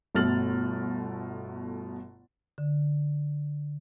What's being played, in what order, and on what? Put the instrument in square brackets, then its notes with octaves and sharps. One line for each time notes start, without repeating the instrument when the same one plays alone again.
[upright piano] G1 B2 A3 F6 A6 F#7
[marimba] D3